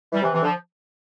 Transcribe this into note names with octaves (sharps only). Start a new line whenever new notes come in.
E3 G3
C3 E3
C3 E3
D3 F3